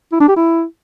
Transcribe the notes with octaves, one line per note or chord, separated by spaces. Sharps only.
E4
D4
G4
E4